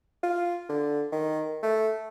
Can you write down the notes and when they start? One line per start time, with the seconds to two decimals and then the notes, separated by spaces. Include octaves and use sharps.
0.23 F4
0.69 D3
1.12 D#3
1.63 A3